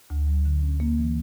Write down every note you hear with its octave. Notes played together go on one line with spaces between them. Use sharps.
D2
F#3
D3
C#4
A#3
E3